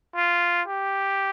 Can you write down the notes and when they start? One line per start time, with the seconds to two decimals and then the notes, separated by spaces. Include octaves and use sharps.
0.15 F4
0.68 G4